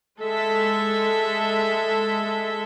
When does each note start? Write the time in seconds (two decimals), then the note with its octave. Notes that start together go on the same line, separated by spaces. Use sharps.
0.20 G#3 A4 E5